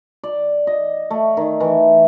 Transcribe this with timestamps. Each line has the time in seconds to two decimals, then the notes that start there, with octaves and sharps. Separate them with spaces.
0.24 D5
0.67 D#5
1.10 A3
1.37 D#3
1.60 E3